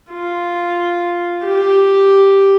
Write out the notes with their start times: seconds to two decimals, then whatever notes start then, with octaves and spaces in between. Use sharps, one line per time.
0.11 F4
1.43 G4